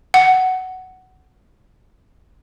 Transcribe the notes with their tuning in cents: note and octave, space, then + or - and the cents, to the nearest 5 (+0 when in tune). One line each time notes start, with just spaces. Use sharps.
F#5 +10